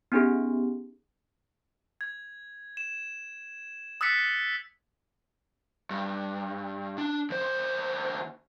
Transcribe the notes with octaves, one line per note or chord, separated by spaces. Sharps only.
B3 C#4 D#4 G4 G#4
G#6
E7
D#6 E6 F#6 A6 B6 C#7
G2
D4
D#2 C5